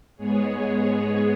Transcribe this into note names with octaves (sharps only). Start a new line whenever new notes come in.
G#2 G#3 B3 G#4 C#5
G#4 C#5